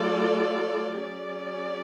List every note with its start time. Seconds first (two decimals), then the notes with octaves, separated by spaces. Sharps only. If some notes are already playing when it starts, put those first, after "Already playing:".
Already playing: F#3 A3 F4 A4 D5
1.00 F#3 C#4 G#4 D5